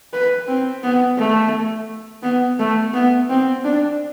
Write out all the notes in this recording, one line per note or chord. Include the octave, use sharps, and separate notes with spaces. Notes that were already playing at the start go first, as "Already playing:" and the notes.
B4
C4
B3
A3
B3
A3
B3
C4
D4